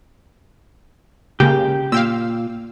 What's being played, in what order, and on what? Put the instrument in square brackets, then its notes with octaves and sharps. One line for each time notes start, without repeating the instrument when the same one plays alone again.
[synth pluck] C#3 G#3 A#3 [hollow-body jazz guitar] G4
[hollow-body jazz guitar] A#2 [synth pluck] F5 G5 E6